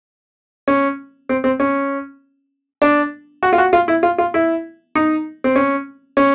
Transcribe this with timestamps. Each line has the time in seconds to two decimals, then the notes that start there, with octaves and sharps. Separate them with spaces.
0.68 C#4
1.29 C4
1.44 C4
1.60 C#4
2.82 D4
3.43 F#4
3.53 F4
3.58 F#4
3.73 F4
3.88 E4
4.03 F4
4.18 F4
4.34 E4
4.95 D#4
5.44 C4
5.56 C#4
6.17 C#4